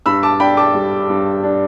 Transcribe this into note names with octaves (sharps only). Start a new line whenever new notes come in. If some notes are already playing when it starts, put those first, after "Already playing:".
G2 B5 E6
A5 D6
D4 G5 B5
A5 D6
G3
G2
D4